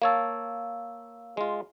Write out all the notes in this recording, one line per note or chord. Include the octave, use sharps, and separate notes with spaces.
A#3 C#5 F5 A5 E6
G#3 F4